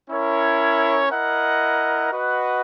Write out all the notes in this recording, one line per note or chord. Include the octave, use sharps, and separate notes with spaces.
C#4 E4 A#4 C#5
E4 A#4 D#5 F#5
F#4 B4 D#5 F#5